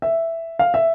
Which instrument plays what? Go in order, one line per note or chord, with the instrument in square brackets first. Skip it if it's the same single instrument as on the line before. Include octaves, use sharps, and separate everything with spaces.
[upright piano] E5
F5
E5